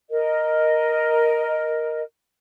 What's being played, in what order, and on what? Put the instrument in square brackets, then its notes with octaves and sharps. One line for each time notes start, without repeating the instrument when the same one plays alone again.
[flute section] A#4 D#5